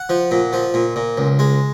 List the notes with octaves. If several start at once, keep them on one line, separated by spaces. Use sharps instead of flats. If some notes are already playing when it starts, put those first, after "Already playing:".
Already playing: F#5
F3
A#2
F3
A#2
A#2
C#2
G#3